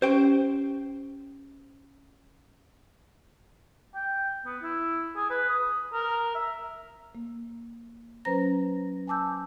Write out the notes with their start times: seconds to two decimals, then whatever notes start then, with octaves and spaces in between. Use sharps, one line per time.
0.02 C#4 G4 C5 G5
3.95 G5
4.45 B3
4.63 E4
5.16 G#4
5.30 B4
5.49 D#6
5.93 A#4
6.35 E5
7.15 A#3
8.25 F#3 C#4 B4 C5 A#5 A#6
9.07 G#5 A5 D6 E6 G6